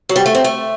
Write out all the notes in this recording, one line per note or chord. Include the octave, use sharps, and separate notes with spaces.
F#3
G3
A3
C4
A3